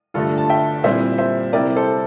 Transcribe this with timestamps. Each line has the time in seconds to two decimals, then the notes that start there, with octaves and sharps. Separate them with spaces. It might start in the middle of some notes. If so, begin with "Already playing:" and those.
0.14 G2 D3 A3 F4 A4
0.38 A5
0.49 E5 G5
0.84 A#2 G3 C4 E4 C5 E5
1.18 C5 E5
1.53 C3 G3 C4 E4 A#4 D5
1.76 A4 C5